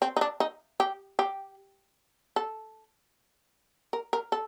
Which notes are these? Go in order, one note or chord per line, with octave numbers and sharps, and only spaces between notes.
C4
D#4
D4
D#4
G4
G4
A4
A#4
A#4
A4